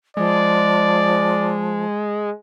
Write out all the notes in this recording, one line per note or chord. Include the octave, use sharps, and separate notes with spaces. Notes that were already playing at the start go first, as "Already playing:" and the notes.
F3 G#3 D5